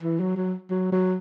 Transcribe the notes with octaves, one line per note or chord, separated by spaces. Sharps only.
E3
F#3
F#3
F#3
F#3